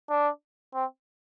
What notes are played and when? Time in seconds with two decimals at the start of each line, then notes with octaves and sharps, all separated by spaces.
0.10 D4
0.75 C4